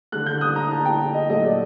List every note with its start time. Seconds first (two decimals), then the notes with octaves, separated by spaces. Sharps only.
0.12 D3 A3 F#6
0.26 G6
0.41 D#6
0.56 A#5
0.71 A5
0.85 G5
1.14 D#5
1.29 A#2 F#3 A3 D#5
1.44 D5